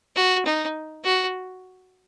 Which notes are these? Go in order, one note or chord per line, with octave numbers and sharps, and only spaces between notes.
F#4
D#4
F#4